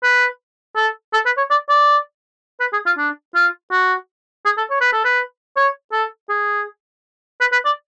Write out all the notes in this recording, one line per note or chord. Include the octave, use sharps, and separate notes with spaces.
B4
A4
A4
B4
C#5
D5
D5
B4
G#4
F4
D4
F4
F#4
G#4
A4
C#5
B4
A4
B4
C#5
A4
G#4
B4
B4
D5